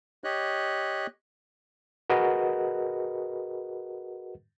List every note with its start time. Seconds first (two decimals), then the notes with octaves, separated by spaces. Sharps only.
0.24 G4 C#5 D#5 F#6
2.10 F#4 G#4 A#4 B4 D#5 F#5